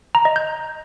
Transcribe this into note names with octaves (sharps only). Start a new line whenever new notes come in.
A#5
D#5
G6